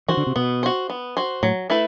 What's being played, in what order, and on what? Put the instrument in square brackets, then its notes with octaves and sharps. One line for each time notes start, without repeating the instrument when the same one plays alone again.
[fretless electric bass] E3 [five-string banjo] F#4 C5
[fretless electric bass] D3
C3
[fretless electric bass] B2 [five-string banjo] B3
[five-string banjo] F#4 C5
B3
F#4 C5
[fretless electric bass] A2 [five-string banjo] F#3
[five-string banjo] A3 E4 B4